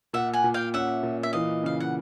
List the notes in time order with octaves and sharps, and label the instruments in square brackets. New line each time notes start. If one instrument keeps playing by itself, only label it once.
[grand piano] A#2 [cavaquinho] E5 F#5
[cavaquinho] F#5 G#5
[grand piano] A#2
[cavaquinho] F5 G5
[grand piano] C#4 [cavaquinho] E5 F#5
[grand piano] A#2
[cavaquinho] E5
[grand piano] E3 [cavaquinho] D#5 F5
[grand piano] C#3 [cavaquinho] F5
[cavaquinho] F#5